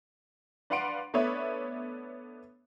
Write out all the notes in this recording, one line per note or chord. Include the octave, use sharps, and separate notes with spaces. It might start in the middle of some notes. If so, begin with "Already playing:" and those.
D4 B4 F5 F#5 C6 D7
A3 B3 D4 B4 C#5 E5